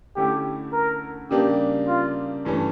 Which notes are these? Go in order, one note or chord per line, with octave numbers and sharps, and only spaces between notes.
D3 A3 C#4 E4 G4
A#4
C#3 G3 A#3 D4 G4
F4
G2 E3 A3 C#4